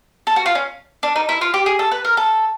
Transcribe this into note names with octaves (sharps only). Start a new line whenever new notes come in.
A4
F#4
F4
C#4
D4
D#4
E4
F4
G4
G#4
A4
B4
A#4
A4